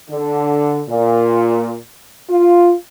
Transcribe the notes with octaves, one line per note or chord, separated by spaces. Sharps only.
D3
A#2
F4